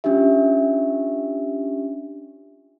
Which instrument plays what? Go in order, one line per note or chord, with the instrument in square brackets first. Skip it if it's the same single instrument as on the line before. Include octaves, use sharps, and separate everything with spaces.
[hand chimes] C#4 D4 F4 G4 E5